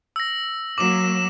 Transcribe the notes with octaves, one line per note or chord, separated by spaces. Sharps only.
E6 A#6
F#3 A#3 D6 E7